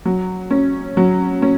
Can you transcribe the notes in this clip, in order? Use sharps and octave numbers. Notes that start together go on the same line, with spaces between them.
F#3
C#4
F#3
C#4